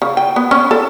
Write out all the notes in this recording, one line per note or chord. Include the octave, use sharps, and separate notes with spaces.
C#3
G5
B3
C#4
A4